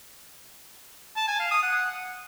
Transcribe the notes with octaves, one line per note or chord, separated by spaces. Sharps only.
A5
G#5
F5
D#6
F#5